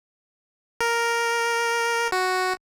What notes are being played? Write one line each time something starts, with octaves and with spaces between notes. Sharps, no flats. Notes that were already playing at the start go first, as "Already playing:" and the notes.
A#4
F#4